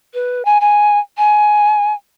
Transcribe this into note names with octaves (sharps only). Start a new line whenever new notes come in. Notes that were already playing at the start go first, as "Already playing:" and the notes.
B4
G#5
G#5
G#5